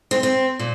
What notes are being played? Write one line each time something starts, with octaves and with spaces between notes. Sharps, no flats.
C4
C4
A#2